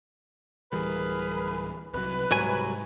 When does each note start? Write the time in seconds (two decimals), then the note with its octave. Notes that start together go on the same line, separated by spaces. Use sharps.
0.73 D1 E3 G3 G#4 A#4 B4
1.94 C2 C3 F#3 B4
2.31 C2 G#2 F#3 G#5